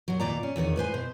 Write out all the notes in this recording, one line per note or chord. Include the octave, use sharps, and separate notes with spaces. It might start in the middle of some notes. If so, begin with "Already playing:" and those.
A#2 F#3
D#2 A#2 D5 A#5
C#4
E2 A#2 D#3 C#5
A2 B4 C5 G#5
B2 C5